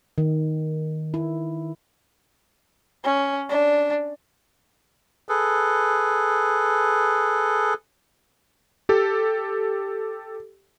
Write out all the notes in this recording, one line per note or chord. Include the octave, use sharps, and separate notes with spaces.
D#3
E4
C#4
D4
G#4 A4 B4
G4 A4